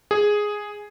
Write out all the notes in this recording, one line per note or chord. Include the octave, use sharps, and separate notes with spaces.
G#4